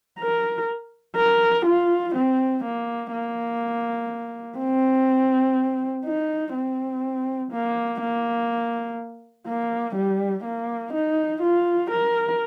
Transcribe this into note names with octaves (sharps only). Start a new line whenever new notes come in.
A#4
A#4
F4
C4
A#3
A#3
C4
D#4
C4
A#3
A#3
A#3
G3
A#3
D#4
F4
A#4